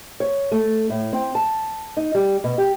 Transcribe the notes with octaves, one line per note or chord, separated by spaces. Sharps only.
C#5
A3
A2
C4
A5
D#4
G3
B2
G4